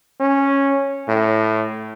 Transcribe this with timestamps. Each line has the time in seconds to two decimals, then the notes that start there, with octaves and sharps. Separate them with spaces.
0.20 C#4
1.08 A2